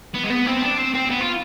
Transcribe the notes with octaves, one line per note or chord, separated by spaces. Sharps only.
B3
G#3
B3
C4
D4
C4
C4
B3
F4